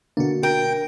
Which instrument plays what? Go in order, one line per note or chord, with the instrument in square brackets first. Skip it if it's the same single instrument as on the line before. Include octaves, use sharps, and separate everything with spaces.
[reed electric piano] B2 D3 A#3 [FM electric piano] D4 F#4
[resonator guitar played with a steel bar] A#4 [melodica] G5